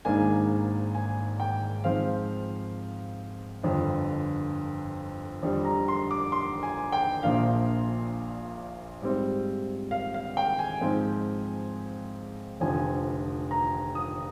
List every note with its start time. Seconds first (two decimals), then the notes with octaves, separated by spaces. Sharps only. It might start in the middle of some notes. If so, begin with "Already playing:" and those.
0.05 G#1 G#2 D#3 A#3 D4 G#5
0.95 G#5
1.40 G5
1.84 G#2 F3 C4 F5
3.63 G1 F2 D3
5.43 F2 D3 G3 D4
5.65 A#5
5.88 C6
6.11 D6
6.32 C6
6.63 G#5
6.92 G5
7.22 A#1 A#2 F3 A#3 D4 F5
9.02 G#2 G3 C4
9.91 F5
10.14 F5
10.37 G5
10.59 G#5
10.81 G#2 F3 C4
12.60 F1 F2 D3 F3 G#5
13.51 A#5
13.95 D#6